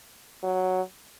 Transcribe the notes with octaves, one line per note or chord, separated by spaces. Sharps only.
F#3